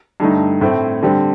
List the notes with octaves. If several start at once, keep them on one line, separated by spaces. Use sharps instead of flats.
G2 D3 A3 D#4
A2 A3 C4
D3 G3 C4